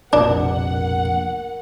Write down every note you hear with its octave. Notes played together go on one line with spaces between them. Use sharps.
F1 A#1 B2 D4 A#4 F#5